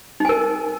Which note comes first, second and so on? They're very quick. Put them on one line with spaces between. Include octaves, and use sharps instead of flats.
D#4 G#5 A#4